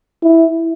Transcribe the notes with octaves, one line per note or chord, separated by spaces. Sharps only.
E4